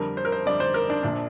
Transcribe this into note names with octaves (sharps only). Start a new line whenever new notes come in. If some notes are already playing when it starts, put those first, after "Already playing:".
Already playing: F2 D3 G3 A#4
C5
A#4
C5
F2 D3 G3 D5
C5
A#4
D4
A#1 A#2 F3 D4